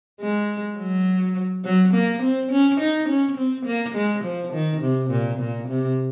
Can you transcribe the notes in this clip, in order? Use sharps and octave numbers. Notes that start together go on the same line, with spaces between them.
G#3
F#3
F#3
A#3
C4
C#4
D#4
C#4
C4
A#3
G#3
F3
D#3
C3
A#2
A#2
C3